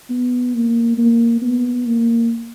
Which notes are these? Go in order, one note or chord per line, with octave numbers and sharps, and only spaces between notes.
B3
A#3
A#3
B3
A#3